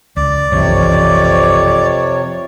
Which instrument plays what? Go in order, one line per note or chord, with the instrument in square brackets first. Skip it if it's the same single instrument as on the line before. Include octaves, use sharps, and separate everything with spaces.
[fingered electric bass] C#2 [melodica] D5
[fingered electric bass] F#1 B1 E3 [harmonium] F2 C3 C#5